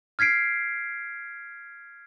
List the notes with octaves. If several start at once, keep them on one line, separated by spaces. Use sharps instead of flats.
F6 G#6 B6 C7 D7